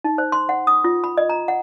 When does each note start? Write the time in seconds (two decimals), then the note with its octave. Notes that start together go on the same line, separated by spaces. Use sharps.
0.04 D#4
0.18 C5
0.32 C6
0.49 F#5
0.67 D#6
0.84 F4
1.04 B5
1.17 D#5
1.29 A#5
1.48 F#5